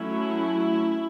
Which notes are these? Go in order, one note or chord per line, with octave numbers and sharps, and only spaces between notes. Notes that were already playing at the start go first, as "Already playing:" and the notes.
Already playing: F#3 A3 C#4 E4